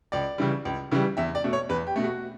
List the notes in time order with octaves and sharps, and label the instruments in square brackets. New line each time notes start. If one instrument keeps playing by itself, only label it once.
[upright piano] C#2 D5
C#3 E3 G3
C#2
C#3 E3 G3
E2 E5
D5
B2 A3
C#5
E2 B4
G4
B2 A3
F#4